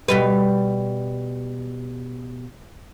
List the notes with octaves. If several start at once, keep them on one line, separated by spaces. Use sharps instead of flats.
B2 G3 B4